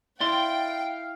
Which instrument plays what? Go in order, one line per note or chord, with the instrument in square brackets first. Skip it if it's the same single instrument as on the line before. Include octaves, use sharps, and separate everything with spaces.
[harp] E4 [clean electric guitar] D5 C6 [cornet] F5 [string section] G5